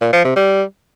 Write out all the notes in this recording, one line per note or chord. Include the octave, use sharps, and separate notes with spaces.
A#2
F3
C3
G3